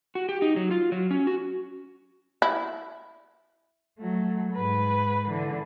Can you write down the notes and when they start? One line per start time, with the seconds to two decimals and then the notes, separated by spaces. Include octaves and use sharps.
0.15 F#4
0.29 G4
0.42 D#4
0.56 F#3
0.71 F4
0.92 F#3
1.11 C#4
1.27 F#4
2.42 E4
3.99 F#3 A3
4.53 G#2 B4
5.29 D3 E3